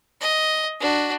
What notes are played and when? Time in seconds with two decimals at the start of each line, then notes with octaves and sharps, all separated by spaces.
0.21 D#5
0.80 D4 F#4